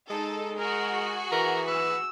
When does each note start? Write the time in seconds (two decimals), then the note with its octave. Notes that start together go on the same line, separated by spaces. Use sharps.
0.10 G#3 D#4 A4
0.58 F#4 G#4 A#4
1.32 E3 A#4 A#5
1.68 B4 E6